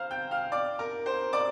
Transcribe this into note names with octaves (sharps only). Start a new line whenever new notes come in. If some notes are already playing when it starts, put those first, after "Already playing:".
Already playing: C5 F5 A#5 F6
G5 G6
F5 F6
D5 D6
A#4 A#5
C5 C6
D5 D6